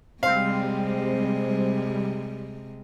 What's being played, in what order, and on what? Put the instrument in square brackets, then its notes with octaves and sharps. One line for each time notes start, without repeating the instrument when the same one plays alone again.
[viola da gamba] C3 G#3 [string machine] G3 [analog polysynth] C4 [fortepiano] F5